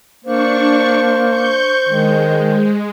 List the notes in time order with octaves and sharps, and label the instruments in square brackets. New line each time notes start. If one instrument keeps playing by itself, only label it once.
[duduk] A#3 [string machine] D4 C#6 [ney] C5
[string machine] C#6 G6
[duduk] D#3 [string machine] G#3